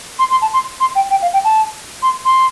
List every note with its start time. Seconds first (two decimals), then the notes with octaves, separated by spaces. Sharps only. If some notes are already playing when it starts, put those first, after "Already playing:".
0.18 C6
0.30 C6
0.41 A5
0.53 C6
0.80 C6
0.95 G5
1.10 G5
1.22 F5
1.33 G5
1.44 A5
2.02 C6
2.25 C6